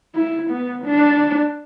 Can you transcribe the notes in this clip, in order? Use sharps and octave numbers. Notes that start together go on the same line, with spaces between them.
E4
B3
D4